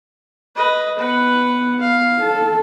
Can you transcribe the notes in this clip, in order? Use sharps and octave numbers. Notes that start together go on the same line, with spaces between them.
B4 D#5
B3 B4 F#5
F5
A4 A5